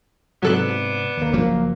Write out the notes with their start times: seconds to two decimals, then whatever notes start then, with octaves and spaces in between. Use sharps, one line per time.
0.43 G#2 C3 F#3 B3 D4 A4 F#6
1.17 D#2 A#3
1.33 F#1 F3 F#3 A#3